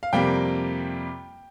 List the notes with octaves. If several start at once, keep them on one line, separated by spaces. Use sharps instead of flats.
F5
F2 C3 G3 A#3 G5